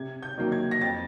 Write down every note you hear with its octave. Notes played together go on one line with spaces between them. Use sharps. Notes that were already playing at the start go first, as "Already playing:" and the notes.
Already playing: C3 G#6
G6
D#3 F#3 A#3
G#6
A#6
F2 A6